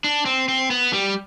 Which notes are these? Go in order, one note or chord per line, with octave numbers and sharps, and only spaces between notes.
D4
C4
C4
B3
G3